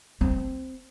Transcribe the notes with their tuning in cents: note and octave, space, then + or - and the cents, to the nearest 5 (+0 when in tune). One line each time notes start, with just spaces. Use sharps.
C4 -5